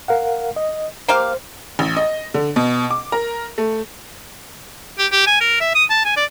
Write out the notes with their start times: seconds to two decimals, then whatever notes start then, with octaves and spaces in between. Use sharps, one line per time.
0.08 A#4 F5 F#5
0.56 D#5
1.08 A#3 G4 C5 F5
1.79 A1
1.97 D#5
2.34 D3
2.56 B2
2.90 D6
3.12 A#4
3.58 A3
4.98 G4
5.12 G4
5.27 G#5
5.40 A#4
5.60 E5
5.75 D#6
5.90 A5
6.05 G#5
6.16 D5